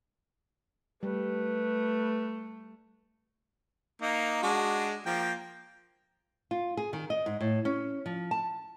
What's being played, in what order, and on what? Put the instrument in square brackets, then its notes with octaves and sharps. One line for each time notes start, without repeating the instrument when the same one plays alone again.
[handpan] G3 [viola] A3 [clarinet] B4
[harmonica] A#3 D#4
G#3 D4 F#4
F3 A#3 G5
[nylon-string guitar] F4
G#4
D#3
D#5
G#2
A2
C#4
F3
A5